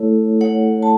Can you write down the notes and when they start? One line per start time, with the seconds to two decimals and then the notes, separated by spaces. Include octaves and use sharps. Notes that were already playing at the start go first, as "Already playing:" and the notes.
Already playing: A3 E4 A4 C#5
0.41 C#5 F#5
0.83 A5